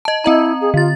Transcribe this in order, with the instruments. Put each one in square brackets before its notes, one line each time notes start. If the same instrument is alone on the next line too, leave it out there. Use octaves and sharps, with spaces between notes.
[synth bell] D#5 A5
[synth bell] C4 D#5 A#5 [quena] E4
[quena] G#4
[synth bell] D3 A6 [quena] F4